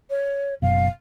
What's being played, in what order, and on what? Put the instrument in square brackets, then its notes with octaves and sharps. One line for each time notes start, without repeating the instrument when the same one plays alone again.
[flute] C#5
[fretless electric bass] F#1 F#2 B2 [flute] F5